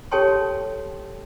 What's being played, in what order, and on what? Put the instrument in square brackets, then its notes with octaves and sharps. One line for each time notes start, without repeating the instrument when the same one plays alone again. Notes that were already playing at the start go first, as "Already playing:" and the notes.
[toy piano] G4 A4 C#5 G5 A5 C6